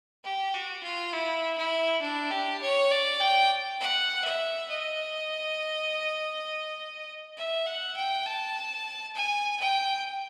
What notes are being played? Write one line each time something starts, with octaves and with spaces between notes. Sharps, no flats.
G4
F#4
F4
E4
E4
D4
G4
C#5
D5
G5
F#5
E5
D#5
E5
F#5
G5
A5
G#5
G5